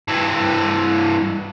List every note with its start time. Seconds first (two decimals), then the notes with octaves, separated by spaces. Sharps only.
0.08 G2 E3